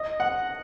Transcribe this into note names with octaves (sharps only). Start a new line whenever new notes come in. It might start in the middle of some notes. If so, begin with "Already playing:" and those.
Already playing: D#5
F#5